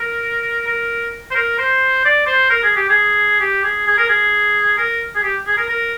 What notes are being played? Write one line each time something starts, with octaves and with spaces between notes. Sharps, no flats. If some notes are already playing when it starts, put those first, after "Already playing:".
Already playing: A#4
A#4
C5
A#4
C5
D5
C5
A#4
G#4
G4
G#4
G4
G#4
G#4
A#4
G#4
A#4
G#4
G4
G#4
A#4
A#4